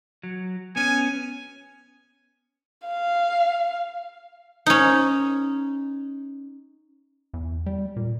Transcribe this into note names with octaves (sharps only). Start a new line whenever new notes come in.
F#3
B3 C#4 G#5
F5
C#4 D#4
E2
G3
A#2